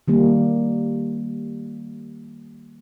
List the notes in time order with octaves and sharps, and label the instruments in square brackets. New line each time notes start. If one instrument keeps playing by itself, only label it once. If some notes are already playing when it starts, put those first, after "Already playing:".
[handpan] D#3 G3 A#3